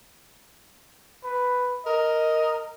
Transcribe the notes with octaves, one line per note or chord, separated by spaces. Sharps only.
B4
A#4 D#5